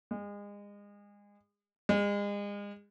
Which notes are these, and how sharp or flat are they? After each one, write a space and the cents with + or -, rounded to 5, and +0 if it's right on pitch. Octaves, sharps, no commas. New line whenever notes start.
G#3 -30
G#3 -35